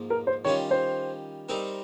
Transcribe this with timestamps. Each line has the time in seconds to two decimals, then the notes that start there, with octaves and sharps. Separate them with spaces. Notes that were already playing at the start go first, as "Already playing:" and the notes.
Already playing: G#2 F3 A#3
0.10 A#4
0.27 C5
0.45 D#3 G3 C#4 F4 C#5
0.71 C5
1.49 G3 C4 D#4 A#4